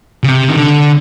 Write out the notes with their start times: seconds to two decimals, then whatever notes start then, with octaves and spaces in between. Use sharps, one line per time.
0.23 C#3
0.28 C3
0.49 D#3
0.58 D3